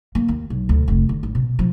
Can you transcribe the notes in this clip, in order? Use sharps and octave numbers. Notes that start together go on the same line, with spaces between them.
A#3
D#2
B1
D2
F1
D3
A1
B2
F3